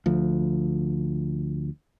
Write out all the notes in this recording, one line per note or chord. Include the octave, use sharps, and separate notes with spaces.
D2 F3